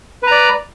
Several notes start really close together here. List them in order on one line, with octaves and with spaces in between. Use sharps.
B4 A#5 D5